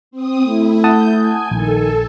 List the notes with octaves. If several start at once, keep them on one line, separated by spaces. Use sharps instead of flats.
C4 D#6
A3 E4
F#5 A5 D#6 G6
G#5
A#1 D#3 A4